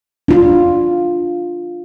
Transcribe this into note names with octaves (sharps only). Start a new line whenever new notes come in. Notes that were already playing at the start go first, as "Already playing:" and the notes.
D4 F4